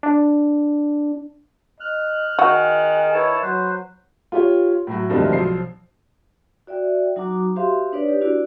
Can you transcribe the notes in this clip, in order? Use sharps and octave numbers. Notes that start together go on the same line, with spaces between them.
D4
D#5 F6 F#6
D#3 F#4 G#4
E4 B4 C#5 A5
F#3 B4 C5
F4 G4 C#5
A2 F#3 F#4
D2 G2 D#3 F3 G#3 C4
B1 F3 C5 C7
F#4 D5 E5 G5
F#3 D#4 F#4 A#5 D6
F#4 G4 C5 E5 F5 C6
D4 D#4 B4 C#5 D5
G4 B4
D4 E4 F#4 D5